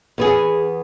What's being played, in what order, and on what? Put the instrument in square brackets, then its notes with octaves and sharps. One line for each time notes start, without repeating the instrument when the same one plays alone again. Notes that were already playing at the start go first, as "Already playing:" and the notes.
[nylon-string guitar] E2 B3 G#4